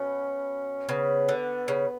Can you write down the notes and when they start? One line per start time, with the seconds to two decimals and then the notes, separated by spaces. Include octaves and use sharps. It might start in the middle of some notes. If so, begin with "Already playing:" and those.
Already playing: B2 C#4
0.89 C#3 B3
1.29 D3
1.68 C#3